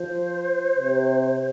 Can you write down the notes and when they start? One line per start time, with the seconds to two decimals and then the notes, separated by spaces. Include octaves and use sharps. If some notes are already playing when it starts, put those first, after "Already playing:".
Already playing: F3 C5
0.78 C3